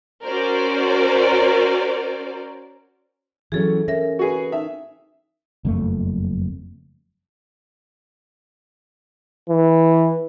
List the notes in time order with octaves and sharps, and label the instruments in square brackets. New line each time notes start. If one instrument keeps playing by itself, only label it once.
[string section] C#4 F#4 A#4 C5 D5
[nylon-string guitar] E3 F#3 C#4 [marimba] G#4 A4
[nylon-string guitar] C#4 [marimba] A#4 E5 A#6
[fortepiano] F#4 G#4 B4
[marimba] D#4 [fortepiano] E5
[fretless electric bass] F#1 F2 A3
[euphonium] E3